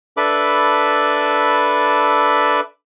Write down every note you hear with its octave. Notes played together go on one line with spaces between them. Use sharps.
D4 A4 B4 E5 B5 D6